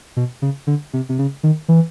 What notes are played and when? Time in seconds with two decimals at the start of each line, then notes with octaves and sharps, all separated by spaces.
0.17 B2
0.42 C#3
0.67 D3
0.93 C3
1.09 C3
1.19 C#3
1.43 D#3
1.69 E3